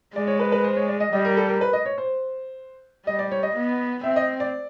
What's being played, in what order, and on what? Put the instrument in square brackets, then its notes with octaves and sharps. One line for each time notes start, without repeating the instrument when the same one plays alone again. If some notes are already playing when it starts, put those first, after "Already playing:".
[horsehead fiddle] G#3 [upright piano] D5
[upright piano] C#5
B4
B4
C5
C#5
D5
D#5
[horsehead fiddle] G3 [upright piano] D#5
[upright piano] A#4
A4
A#4
B4
D#5
C#5
C5
[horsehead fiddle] G3 [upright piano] D#5
[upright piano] D5
C#5
D#5
[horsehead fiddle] B3
[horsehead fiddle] C4 [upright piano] E5
[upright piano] D#5
D5